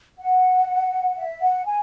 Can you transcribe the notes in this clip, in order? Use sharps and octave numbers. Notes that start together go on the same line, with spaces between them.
F#5
E5
F#5
G#5